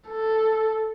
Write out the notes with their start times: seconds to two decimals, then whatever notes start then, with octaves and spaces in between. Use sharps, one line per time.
0.09 A4